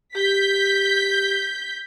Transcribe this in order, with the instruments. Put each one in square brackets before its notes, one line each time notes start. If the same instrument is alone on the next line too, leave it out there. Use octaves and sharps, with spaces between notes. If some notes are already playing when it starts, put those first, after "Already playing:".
[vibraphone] G4 [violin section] G6 B6